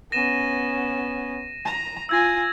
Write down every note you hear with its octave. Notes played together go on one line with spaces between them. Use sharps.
B3 C#4 A#6 D#7 E7
A#5
F4 G#5 E6 G#6 A#6